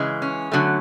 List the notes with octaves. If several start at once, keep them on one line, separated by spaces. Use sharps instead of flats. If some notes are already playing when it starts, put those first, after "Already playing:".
Already playing: C#3 E3 G#3
C#4
D3 F#3 A3